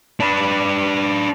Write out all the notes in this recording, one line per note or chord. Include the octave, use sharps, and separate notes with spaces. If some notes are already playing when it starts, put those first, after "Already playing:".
D4 B4